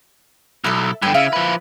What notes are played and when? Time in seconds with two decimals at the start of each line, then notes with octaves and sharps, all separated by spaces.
0.64 B1 E4 A4
1.02 G2 D3 B4 G5 G#5
1.14 C#3 E4 E5 F5
1.33 F3 B4